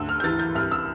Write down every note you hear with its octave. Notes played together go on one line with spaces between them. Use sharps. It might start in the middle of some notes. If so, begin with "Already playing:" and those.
Already playing: D2 E6
F6
G6
E3 A6
G6
C2 F6
E6